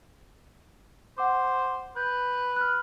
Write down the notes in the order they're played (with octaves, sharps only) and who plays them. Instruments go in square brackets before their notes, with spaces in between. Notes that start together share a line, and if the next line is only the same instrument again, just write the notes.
[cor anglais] C5 [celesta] F#5 D6
[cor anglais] B4 [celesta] G6
[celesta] F6 F#6